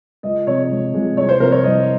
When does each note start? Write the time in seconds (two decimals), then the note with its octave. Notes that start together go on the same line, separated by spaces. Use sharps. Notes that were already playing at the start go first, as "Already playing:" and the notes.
0.23 C#2 D#5
0.47 C3 F3 G#3 C#5
0.71 C#2
0.93 C3 F3 G#3
1.17 C2 C#5
1.29 C5
1.40 C3 F3 A#4
1.52 C#5
1.64 C2 D#5